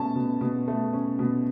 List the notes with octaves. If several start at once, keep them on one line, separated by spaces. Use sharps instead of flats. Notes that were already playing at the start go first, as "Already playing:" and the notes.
Already playing: B2 A3 C#4 A5
B2
B2
A3
C#4
B2